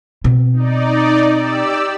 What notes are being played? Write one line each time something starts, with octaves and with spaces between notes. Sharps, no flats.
B2 C4
D#4 D5
G4 D5 E6